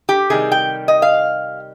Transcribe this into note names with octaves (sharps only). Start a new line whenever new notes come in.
G4
C3 D#3 G3 G#4
G5
D#5
F5